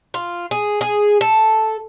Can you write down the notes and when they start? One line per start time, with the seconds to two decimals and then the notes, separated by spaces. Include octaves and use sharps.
0.14 F4
0.51 G#4
0.81 G#4
1.21 A4